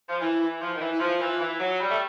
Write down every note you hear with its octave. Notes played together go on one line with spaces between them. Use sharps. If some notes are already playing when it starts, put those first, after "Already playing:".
F3
E3 E4
E3
F3
D#3
E3
E4
F3 F4
E3
E3
F#3
G3
A3